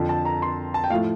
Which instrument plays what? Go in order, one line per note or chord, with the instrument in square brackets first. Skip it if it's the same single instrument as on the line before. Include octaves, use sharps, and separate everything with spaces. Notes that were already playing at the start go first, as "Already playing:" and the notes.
Already playing: [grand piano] F2 D3 F3
A5
A#5
C6
A5
G5
A2 F5
F3 A3